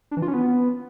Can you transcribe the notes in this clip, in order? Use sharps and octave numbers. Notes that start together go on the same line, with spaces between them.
D4
E3
F4
C#4
B3